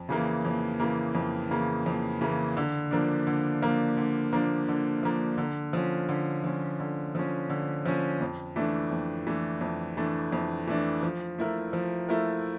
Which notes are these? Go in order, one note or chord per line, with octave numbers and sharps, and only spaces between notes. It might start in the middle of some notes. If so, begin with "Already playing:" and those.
Already playing: F2
C#3 E3 A#3
F2
C#3 E3 A#3
F2
C#3 E3 A#3
F2
C#3 E3 A#3
D3
F3 A#3 D4
D3
F3 A#3 D4
D3
F3 A#3 D4
D3
F3 A#3 D4
D3
F3 C#4
D3
F3 C#4
D3
F3 C#4
D3
F3 C#4
F2
E3 A3 D4
F2
E3 A3 D4
F2
E3 A3 D4
F2
E3 A3 D4
F3
A3 E4 A#4
F3
A3 E4 A#4